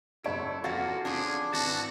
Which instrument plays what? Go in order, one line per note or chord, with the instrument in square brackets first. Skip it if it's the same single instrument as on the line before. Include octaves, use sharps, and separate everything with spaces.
[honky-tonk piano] F#1 C#5 D7 [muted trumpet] E4 [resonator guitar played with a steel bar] A4
[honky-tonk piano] F2 F5 A6 [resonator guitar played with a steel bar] E3 F#4 [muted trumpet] A#3
[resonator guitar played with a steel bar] F3 C#4 D4 [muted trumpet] G#4
[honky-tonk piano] G#1 [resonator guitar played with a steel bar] E3 A5 [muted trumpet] F#4